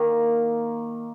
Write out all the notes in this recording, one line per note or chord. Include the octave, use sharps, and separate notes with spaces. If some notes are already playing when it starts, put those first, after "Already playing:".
Already playing: D#3 A#3 D#4